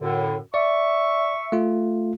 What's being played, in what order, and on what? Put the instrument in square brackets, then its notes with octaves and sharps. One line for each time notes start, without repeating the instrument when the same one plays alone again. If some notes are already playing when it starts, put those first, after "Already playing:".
[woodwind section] F#2 A2 D3
[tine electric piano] D5 [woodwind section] E5 C#6
[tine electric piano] A3 F4